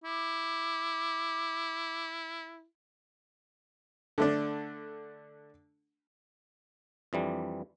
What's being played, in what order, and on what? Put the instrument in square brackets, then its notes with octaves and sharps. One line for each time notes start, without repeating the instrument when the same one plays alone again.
[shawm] E4 [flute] D6
[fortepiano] D3 A3 D4
[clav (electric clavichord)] F2 E3 G3 D4